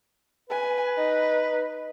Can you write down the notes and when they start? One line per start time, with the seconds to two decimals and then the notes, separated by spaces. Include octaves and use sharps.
0.50 B4 G#5
0.97 D#4